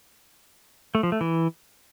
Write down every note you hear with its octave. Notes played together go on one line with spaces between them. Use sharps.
A3
F3
A3
E3